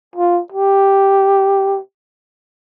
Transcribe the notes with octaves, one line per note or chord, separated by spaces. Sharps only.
F4
G4